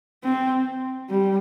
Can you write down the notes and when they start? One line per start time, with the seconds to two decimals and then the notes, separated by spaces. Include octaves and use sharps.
0.24 C4
1.10 G3